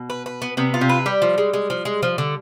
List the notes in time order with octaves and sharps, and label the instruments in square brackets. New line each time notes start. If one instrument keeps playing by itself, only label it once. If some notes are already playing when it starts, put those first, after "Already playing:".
Already playing: [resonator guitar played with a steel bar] B2
[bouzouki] B4
B4
B3
[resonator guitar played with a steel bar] C3 [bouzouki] B3
[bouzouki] F4
[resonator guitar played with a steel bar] C3
[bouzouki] B4
[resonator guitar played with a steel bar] G3 [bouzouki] G4
[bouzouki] F3
G#3
G#3
F3
G#3
F3
D3